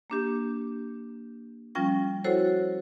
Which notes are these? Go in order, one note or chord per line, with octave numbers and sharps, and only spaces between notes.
A#3 D4 G4
F3 G3 C#4 F4 G5 A#6
E4 F#4 A4 C5 C#5 F#5